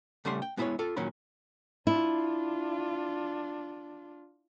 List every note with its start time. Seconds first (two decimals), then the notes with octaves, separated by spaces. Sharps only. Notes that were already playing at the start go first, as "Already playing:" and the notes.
0.25 C#3 G3 A3 C#4 F#5 C6
0.42 G5
0.57 G#3 B3 E4 A4 B4 C#5
0.79 F4 A4
0.96 A#2 D#3 F#3 C#4 B5
1.87 D4 E4 F4